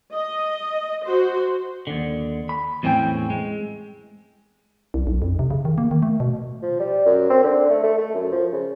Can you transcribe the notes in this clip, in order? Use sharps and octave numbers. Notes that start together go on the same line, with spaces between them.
D#5
F#4 C5
D#2 D3
B5
E2 A2 C4 C#4 G5
G#3
C2
B1
F2
C3
C#3
D#3
A#3
D#3
A3
B2
F3
G3
F#2
C4
D3
A3
A3
A3
F#2
F3
C#3